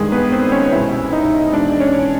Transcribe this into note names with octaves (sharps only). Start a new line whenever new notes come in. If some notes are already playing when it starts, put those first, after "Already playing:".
Already playing: G2 D#3 G3 G#3 G#4
B3 B4
C4 C5
C#4 C#5
C2 B2 G#3 E4 E5
D#4 D#5
E2 B2 G#3 D4 D5
C#4 C#5